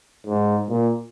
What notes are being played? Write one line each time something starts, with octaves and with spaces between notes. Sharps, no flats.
G#2
A#2